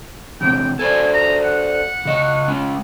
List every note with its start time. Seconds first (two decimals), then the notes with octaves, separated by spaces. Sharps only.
0.41 E2 C3 G5
0.79 A4 C5 D5 G#5
1.14 A#5
1.44 F#5
2.05 C#3 D#5
2.48 G#3 C#4